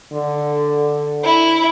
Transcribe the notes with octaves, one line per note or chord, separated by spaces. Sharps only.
D3
E4